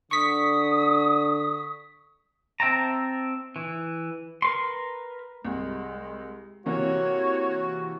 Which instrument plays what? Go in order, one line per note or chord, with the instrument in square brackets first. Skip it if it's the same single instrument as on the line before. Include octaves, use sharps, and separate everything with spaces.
[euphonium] D3 [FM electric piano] C#6 B6 [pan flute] D#6
[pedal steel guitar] C4 E5 G5 A5 A#5
E3
A#4 B4 C6
[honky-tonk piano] C2 [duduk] G#3
[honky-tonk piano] C3 E3 A#3 [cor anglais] F#4 [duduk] C#5